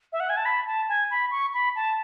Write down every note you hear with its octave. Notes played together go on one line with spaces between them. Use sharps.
E5
F#5
G#5
A5
B5
A5
G#5
B5
C#6
B5
A5